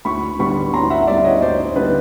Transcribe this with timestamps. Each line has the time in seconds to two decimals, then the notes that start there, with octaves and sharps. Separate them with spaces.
0.05 D2 B5 C#6
0.39 D3 G3 B3 B5 C#6
0.74 D2 A#5 C6
0.90 E5 F#5
1.07 D3 G3 B3 D5 E5
1.24 C#5 D#5
1.41 D2 C5 D5
1.76 D3 G3 B3 B4